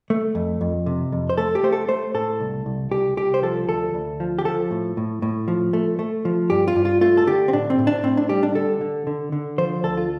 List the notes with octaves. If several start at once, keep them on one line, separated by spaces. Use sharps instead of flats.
A3
F2
F2
C3
F2
C5
A3 A4
G4
A3 C5
A4
A3 C5
A2 A4
C2
C2
C2 G4
C2 G4
C5
F3 A4
D2 A4
D2
F3
G4
F3 A4
A2
A2
A2
F3
A3
A3
F3
G2 G4
F4
G2
F4
A3 F4
A4
D3 G4
C4
A2 D4
C4
A2
D4
A2 C4
D4
G3 G4
D4
D3 A4
D3
D3
D3
F3 C5
D2 A4
F4